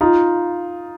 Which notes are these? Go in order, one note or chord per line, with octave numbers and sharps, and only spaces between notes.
D#4 F4